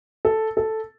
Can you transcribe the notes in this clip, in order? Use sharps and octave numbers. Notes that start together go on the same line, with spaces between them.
A4
A4